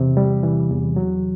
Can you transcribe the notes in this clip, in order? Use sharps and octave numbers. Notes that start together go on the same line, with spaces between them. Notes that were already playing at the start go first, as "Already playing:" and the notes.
Already playing: E2 C3 E3
G3
E3
E2
F#3